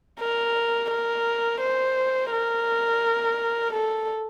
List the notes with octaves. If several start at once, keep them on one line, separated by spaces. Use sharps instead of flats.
A#4
A#4
C5
A#4
A4